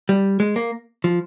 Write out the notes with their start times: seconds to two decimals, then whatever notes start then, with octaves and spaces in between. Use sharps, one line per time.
0.09 G3
0.40 G#3
0.56 A#3
1.04 F3